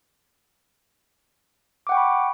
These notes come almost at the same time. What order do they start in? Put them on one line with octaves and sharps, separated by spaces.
D6 F#5 G5 C#6 B5